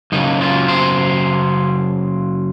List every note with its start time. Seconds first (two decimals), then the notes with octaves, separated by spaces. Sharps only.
0.12 F#2 C#3 D#4
0.41 F4
0.68 C5